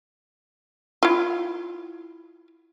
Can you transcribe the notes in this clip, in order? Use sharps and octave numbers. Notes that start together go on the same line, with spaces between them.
E4 F4